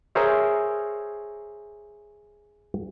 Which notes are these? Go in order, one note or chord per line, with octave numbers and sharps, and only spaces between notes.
G#4 A#4 C5 C#5 E5